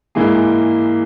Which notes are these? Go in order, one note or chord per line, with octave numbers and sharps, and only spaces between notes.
G#2 E3 A#3 E4 G#4